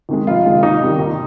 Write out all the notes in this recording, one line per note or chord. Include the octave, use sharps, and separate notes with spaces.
D#2 D#3 G#3
F1 F4
D#2 D#3 G#3 F4
D#2 D#4
D#3 G3
D#2